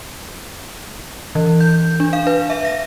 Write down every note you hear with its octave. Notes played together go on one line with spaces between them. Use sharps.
E3
G6
D4
F5
B4
E5
A#6